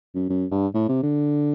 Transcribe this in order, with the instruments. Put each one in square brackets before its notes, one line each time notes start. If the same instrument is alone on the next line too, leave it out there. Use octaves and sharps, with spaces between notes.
[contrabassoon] F#2
F#2
G2
A2
C3
D3